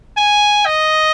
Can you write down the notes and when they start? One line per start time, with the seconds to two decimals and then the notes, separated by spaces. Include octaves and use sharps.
0.17 G#5
0.66 D#5